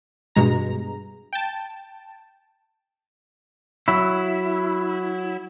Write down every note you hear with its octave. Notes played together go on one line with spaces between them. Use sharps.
G2 B2 G#3 A#5
G5 A5
F#3 E4